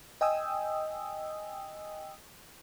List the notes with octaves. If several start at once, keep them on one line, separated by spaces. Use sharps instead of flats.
D#5 G5 G#5 D#6 E6